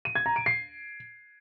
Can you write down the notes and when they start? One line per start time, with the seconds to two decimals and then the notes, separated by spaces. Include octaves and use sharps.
0.05 D#7
0.15 G#6
0.26 A#5
0.36 D7
0.46 C7